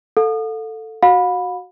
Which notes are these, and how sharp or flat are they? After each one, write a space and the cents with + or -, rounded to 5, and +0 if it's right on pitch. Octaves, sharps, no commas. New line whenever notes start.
A4 +10 F5 +45
F#4 +0 F5 +45 B5 +0